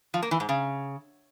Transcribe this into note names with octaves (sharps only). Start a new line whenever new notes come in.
F3
A#3
E3
G#2
C#3